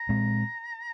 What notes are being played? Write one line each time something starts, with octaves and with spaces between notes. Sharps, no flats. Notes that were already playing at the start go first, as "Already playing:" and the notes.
Already playing: A#5
A#2 G#3 C4